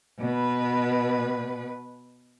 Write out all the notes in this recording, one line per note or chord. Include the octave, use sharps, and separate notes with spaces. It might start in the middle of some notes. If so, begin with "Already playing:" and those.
B2 B4